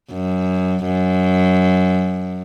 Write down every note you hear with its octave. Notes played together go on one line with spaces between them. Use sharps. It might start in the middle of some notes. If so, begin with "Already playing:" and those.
F#2
F#2